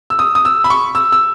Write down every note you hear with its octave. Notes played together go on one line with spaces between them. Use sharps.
E6
D#6
D#6
E6
B5
C#6
E6
E6